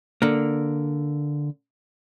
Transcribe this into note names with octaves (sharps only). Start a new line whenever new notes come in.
D3 A#3